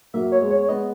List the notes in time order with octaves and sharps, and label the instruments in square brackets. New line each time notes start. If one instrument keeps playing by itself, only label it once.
[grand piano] F#3 A#3 [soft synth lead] E5
[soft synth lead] C#5
[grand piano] G#3 B3
[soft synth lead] C#5
C#5
[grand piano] G#3 B3 [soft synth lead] D#5